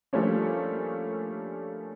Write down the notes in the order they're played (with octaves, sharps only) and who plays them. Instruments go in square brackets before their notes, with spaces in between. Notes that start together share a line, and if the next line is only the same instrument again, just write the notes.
[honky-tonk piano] F3 G3 A3 A#3 C#4 D4